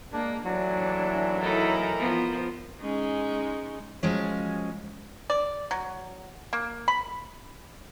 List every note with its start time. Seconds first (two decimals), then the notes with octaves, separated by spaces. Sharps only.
0.13 G#3 A#3 D4
0.45 D#2 A2 E3 F#3 D4
1.42 D#4 E4 A4 A#4
1.98 F3 B3
2.80 G#3 C#4 D#4
4.03 F3 F#3 G#3 C#4
5.30 D5
5.71 F#3
6.53 A#3
6.88 B5